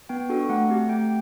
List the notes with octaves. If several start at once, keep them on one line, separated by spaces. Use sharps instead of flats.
B3 G5
D4 F#4 A4
A3 F#5
C4 G4
A3 G5